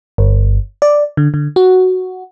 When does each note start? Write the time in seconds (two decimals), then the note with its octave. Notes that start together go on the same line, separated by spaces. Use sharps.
0.18 G1
0.82 D5
1.17 D3
1.34 D3
1.56 F#4